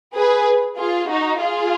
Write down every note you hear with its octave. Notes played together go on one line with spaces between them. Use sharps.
G#4 B4
F4 G#4
D#4 F#4
F4 G#4